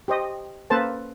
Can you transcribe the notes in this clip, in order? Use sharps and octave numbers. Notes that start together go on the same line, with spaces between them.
G4 C5 D#5
A#3 C#4 A4 B4 C5 A5